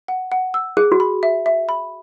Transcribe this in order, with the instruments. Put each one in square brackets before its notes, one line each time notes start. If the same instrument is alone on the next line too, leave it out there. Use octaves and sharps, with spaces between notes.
[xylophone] F#5
F#5
E6
[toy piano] G#4 [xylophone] F#6
[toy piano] F#4
[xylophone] B5
E5
E5
B5